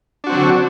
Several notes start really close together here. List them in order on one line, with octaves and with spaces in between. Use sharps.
D4 F#4 C4 F#3 D3